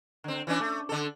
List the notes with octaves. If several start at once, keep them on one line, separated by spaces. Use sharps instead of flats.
D3 C4
E3 C#4 D4
A3
D3 A4